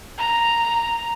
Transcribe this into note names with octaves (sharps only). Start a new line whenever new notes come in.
A#5